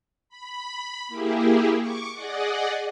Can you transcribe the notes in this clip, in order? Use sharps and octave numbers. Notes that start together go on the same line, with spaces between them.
B5
A#3 E4 G4 G#4
C#6 D6
G#4 D5 D#5 F#5